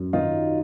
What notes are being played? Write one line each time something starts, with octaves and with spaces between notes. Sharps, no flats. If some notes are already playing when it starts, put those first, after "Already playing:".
Already playing: F#2
D#3 D#4 F4